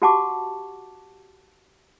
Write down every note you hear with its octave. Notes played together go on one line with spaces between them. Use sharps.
F#4 G4 F#5 A5 C#6 D6